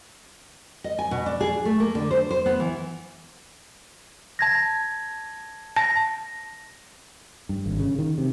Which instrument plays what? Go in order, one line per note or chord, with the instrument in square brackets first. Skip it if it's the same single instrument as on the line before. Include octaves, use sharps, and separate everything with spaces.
[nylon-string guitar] D#5
G#5
B2
D4
G#4
A3
A#3
D3
C5
C5
B3
E3
[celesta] A5 G#6 A#6
[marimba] A5 [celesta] A#6
[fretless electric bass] G2
G#1
C#3
D#3
C3